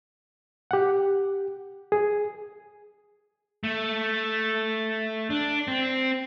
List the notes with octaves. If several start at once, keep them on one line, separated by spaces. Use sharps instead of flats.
G4 F#5
G#4
A3
D4
C4